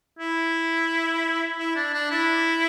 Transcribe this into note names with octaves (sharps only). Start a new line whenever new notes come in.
E4
E4
D4
D4
E4